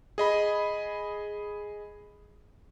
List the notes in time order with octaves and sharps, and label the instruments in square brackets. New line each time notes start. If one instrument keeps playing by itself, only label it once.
[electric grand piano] G#4 D#5 B5